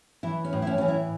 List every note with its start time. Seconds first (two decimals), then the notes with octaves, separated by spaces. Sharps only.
0.23 E3 E4
0.45 C#4
0.53 A2
0.62 E4
0.67 C#4
0.78 E3 C#4
0.88 E4